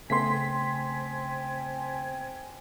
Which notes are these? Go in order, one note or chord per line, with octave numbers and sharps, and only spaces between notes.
C#3 A3 B3 C4 G5 G#5 C6 B6